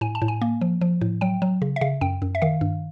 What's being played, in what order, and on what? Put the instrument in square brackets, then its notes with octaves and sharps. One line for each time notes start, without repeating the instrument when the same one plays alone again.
[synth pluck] A2 G#5
A5
A2
G#5
A#3
F3
F3
A2
F#3 G5
F#3
C#3
E5
C#3 F5
F#2 G5
F#2
E5
D#3 F5
G2